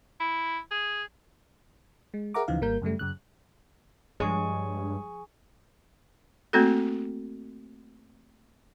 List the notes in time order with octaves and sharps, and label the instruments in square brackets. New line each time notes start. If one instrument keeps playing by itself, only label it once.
[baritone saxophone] E4
G#4
[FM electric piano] G#3
G#4 A#4 E5 F#5 A#5 D6
D2 C#3 E3 F3 D#4 F5
G#1 G3 A#3 A#4 G6
F#2 C#3 G3 A3
F#2 C#3 F#6
[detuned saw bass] G2 [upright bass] F3 [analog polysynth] G#3 C#5 [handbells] G#4 G#5 C#6
[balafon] A3 A#3 C4 F#4 A4